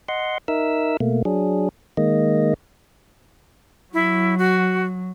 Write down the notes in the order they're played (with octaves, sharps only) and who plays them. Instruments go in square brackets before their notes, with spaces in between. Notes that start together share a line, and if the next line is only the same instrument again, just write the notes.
[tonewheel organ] D#5 F#5 C6
D#4 A#4 E5 E6
B2 A3 A#3
F#3 D4 G#4
D#3 G#3 A#3 D#5
[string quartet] F#3 [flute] E4
[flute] F#4